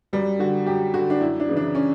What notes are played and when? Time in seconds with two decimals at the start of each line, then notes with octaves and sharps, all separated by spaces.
0.13 F#2 G3
0.39 D3 F#4
0.66 F#2 G4
0.94 D3 F#4
1.10 D4
1.20 F#2 E4
1.40 D4
1.49 C#3 E3
1.57 D4
1.75 C#4